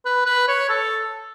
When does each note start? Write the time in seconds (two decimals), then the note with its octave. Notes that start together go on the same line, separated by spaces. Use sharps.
0.05 B4
0.26 B4
0.48 C#5
0.69 A4